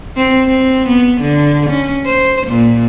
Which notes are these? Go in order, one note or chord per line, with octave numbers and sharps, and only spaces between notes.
C4
C4
B3
D3
C#4
C5
A#2